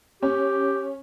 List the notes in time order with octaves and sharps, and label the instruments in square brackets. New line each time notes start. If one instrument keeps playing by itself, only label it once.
[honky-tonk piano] C#4 [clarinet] G4